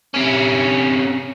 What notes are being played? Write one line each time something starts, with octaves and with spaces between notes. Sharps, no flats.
C3 C#4